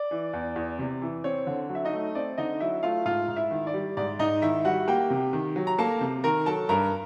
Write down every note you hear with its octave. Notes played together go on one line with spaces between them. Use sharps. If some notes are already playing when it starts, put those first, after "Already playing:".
Already playing: D5
E3
E2
E2
C3
E3
C4 C#5
D3
F#3
E5
D#4 D#5
A3
C4 D5
D3 D#4 D#5
F#3 E4 E5
A3 F4 F5
G#2 F4 F5
G#2
E4 E5
D#3
D5
G3
G#2 D5
G#2 D#4 D#5
D#3 E4 E5
G3 F#4 F#5
A#3 G4 G5
C3
D#3
F#3
A#5
A#3 A4 A5
C3
D#3 A#4 A#5
F#3 A4 A5
G2 A#4 A#5